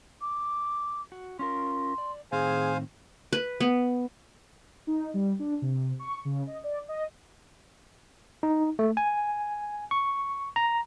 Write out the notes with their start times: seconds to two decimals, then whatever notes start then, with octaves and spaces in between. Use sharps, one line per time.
0.21 D6
1.12 F#4
1.39 C#4 F4 A#4 C6
1.98 D5
2.32 A2 D#3 C4 G#4 C5 F5 G#5
3.33 B4
3.60 B3
4.87 D#4
5.14 G3
5.39 D4
5.62 C3
5.99 C#6
6.25 C#3
6.47 D#5
6.64 D5
6.89 D#5
8.43 D#4
8.79 A3
8.97 G#5
9.91 C#6
10.56 A#5